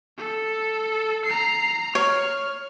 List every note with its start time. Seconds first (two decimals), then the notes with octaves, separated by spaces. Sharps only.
0.17 A4
1.25 A#5 C7
1.95 C#5 F6